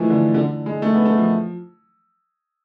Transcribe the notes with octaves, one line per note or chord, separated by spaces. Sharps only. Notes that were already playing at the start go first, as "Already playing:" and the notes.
Already playing: E3 F3 G#3 A3
D3
D3
G#3
A3
B3
A3
F3